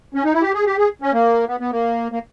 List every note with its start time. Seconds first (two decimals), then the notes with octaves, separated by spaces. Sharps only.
0.14 C#4
0.24 D#4
0.33 E4
0.42 G4
0.54 G#4
0.66 G4
0.78 G#4
1.02 C#4
1.13 A#3
1.48 B3
1.60 B3
1.72 A#3
2.12 A#3